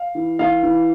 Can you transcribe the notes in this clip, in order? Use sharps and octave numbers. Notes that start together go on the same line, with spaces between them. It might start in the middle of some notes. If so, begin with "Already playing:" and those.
Already playing: F5
E3
E3 F5
E3